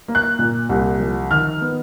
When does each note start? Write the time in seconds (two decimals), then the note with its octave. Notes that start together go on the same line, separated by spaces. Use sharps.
0.08 A#3
0.15 F#6
0.39 A#2
0.69 C2
1.00 F3
1.31 D#3 F6
1.61 B3